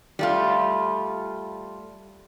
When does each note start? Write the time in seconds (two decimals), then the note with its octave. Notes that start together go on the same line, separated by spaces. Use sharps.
0.19 G3 A3 F4